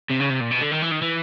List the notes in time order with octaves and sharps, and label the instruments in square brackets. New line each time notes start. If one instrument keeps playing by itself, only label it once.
[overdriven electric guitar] C3
C#3
C3
A#2
B2
D3
D#3
E3
D#3
E3